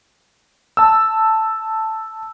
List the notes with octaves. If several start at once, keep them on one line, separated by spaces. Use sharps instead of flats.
A5 E6